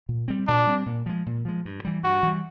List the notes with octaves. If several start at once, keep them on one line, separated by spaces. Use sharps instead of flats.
A#2
G3 C4
A#2 D4
G3 C4
A#2
F3 G#3
A#2
F3 G#3
G2
E3 G3
G2 F#4
E3 G3